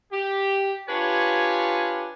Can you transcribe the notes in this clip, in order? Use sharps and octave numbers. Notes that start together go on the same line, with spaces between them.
G4
D4 F4 G4 B4 C#5 G#5